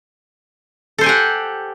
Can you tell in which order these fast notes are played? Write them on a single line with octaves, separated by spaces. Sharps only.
A4 C5 G#5 G4 F#5